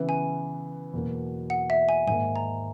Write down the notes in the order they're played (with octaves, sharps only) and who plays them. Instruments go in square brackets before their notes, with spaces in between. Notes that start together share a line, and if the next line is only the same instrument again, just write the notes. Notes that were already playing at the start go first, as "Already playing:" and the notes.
Already playing: [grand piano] C#3 E3 B3 E4
[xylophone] G#5
[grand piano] E2 B2 F#3 A#3
[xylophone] F#5
E5
G#5
[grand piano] G#2 D#3 A#3 [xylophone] G#5
[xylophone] A#5